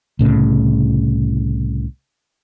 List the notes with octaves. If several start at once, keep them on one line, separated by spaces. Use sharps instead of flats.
C2 A2 C#3